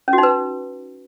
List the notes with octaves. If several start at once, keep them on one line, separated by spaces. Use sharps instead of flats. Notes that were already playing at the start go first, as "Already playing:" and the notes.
C#4
F#4
D#4
B4